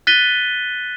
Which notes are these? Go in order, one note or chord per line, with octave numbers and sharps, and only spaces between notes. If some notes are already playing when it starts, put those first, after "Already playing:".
F#6 A6 B6 D#7 G7